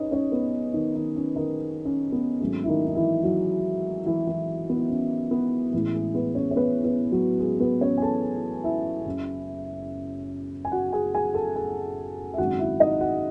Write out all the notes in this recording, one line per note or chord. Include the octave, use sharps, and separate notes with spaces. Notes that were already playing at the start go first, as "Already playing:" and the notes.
Already playing: F#2 C#4 D#4 B4 C#5 D#5
C#4 C#5
B3 B4
D#3 D#4
D#3 D#4
C#4
D#3 D#4
C#4
B3
G#1 G#2 F#3 A3 C#4
E4
D#3 D#4
D#4
E3 E4
F#3 F#4
E3 E4
E3 E4
B3
C#4
B3
A1 A2 E3 G#3 E4
G#3 G#4
B3 B4
C#4 C#5
C#5
B3 B4
B3 B4
F#3 F#4
G#3 G#4
B3 B4
C#4 C#5
G#5
A4 A5
E4 E5
F#1 F#2 C#3
G#5
F#4 F#5
G#4 G#5
G#4 G#5
A4 A5
G#4 G#5
E5
G#1 F#2 C#3 F#4 F#5
E4 E5
D#4 D#5
F#4 F#5